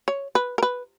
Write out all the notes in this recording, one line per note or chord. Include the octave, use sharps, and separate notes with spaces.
C#5
B4
A#4
B4